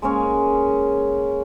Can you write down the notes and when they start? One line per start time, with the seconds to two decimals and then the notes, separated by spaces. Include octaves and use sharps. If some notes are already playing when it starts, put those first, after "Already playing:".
0.02 G#3 A#3 C#4 C#5